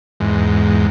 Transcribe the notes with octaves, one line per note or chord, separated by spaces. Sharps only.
E2 G#2